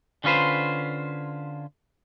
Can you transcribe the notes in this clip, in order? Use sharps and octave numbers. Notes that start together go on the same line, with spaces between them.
D3 C#4 F4 B4 C5